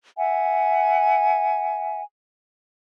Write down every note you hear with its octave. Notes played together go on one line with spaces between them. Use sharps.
E5 F#5 G#5